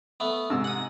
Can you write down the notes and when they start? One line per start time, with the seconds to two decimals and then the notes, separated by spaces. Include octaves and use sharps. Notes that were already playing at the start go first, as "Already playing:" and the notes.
0.20 A3 B3
0.50 G#2 C3 E6
0.64 F#5 D#6